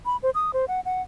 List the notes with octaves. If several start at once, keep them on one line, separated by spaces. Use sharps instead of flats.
B5
C5
D#6
C5
F#5
F#5